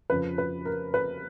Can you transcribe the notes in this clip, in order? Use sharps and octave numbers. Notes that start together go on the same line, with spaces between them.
F2 C#3 F3 B4
B4
A#4
B4